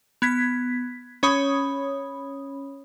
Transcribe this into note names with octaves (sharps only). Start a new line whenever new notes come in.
B3 G#6 B6
C#4 C#5 B5 D#6